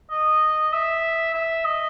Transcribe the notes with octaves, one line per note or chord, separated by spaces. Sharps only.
D#5
E5
E5
D#5